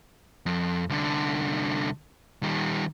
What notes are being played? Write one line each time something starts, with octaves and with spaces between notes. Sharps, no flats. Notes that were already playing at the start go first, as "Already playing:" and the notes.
F2
C2 D3
D#3 G3